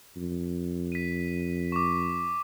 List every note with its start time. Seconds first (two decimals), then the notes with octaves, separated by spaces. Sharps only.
0.17 F2
0.92 B6 D#7
1.72 C#6 D6